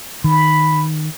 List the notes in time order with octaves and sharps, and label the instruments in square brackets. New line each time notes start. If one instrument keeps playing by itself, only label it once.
[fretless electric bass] D#3 [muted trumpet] B5